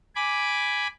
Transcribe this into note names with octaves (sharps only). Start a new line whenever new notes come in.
G#5 B5 D6